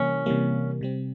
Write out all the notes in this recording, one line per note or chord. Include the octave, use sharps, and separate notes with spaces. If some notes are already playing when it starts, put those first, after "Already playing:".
Already playing: C3 E3 G3 A#3 C#4
C3 E3 G3 A#3
C3 G3 C4